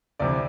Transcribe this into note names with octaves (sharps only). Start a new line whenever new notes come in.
D2 C3 E3 D5